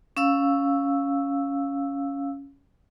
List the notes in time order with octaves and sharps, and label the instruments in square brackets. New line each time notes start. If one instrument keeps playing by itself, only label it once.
[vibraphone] C#4 F5 E6